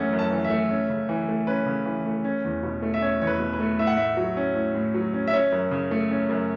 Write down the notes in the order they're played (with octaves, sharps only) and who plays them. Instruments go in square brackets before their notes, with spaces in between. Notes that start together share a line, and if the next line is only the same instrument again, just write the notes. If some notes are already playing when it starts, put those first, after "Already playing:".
Already playing: [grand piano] F#2 E3 A3 C#4 F#5
F#2
A5
E3
E5
A3
C#4
C#3
E3
A3
C#4 B4
C#3
E3
A3
C#4
E2
B2
A3
E5
C#4 C#5
E2 C#5
B4
B2
B4
A3
A2 E5
F#5
A2 E5
F#3
C#4
A2
A2
F#3
C#4
E5
C#4 C#5
F#2
C#3
A3
C#4
F#2